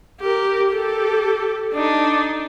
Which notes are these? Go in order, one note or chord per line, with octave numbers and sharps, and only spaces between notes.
G4 A#4
G4 A4
D4 D#4